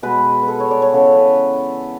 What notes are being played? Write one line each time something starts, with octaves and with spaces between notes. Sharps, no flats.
B2 G#3 B3 B4
A4 B4
C#5
D5
C#5
C#3 E3 B3 A4
B4